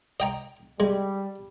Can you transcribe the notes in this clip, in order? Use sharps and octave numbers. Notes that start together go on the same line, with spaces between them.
D#5 G5 A#5
G3 G#3